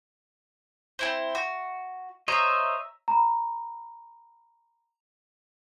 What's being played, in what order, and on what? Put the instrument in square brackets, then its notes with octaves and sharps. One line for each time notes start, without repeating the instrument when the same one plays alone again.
[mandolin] C4 E4 C5
F#4
[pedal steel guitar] C5 C#5 D#5 [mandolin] E5 A#5
[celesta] A#5 B5